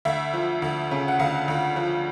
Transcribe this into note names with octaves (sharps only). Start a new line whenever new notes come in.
D2 E5
F3
D2
C#3
F#5
D2 F5
D2
F3